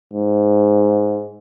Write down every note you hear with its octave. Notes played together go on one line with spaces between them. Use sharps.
G#2